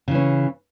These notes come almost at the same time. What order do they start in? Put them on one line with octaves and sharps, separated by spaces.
C#3 E3 C#4